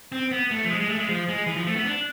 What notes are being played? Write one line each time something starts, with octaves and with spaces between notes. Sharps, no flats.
C4
B3
A3
F3
G#3
G#3
A3
G#3
F3
G#3
E3
F3
A3
B3
D4